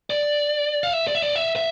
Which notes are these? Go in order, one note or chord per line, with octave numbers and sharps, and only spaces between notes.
D5
F5
E5
D5
E5
D5
E5
E5